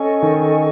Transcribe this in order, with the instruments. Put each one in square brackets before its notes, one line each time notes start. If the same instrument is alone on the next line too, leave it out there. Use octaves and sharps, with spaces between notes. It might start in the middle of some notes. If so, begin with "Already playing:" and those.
Already playing: [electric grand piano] C#4 [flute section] A4 D#5 G#5 C#6
[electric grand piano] D#3